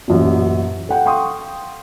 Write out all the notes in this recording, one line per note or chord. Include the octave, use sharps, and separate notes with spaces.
A1 F#2 A#2
A4 F#5 G5
F5 G5 C6 C#6 D#6